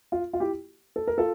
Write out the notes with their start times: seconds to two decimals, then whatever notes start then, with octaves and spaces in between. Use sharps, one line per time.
0.12 F4
0.33 F4
0.40 E4 G4
0.96 A4
1.07 A#4
1.18 F4 A4